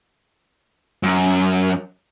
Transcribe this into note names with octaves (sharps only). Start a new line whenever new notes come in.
F#2